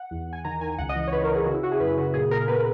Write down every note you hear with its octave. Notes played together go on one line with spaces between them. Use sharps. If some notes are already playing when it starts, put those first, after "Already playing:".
Already playing: F#5
E2
E2
G#5
D#3 A#5
D#3 G#5
C#2 F#5
D#5
E3
D#5
C#5
C#2 B4
A#4
C#2
G#4
C#3 F#4
E4
C#3 F#4
G#4
F#2 B4
C#3 F#4
A#2 G#4
A#2 A#4
B3 B4
B4